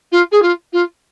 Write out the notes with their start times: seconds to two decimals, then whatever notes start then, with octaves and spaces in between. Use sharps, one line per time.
0.12 F4
0.32 G#4
0.42 F4
0.73 F4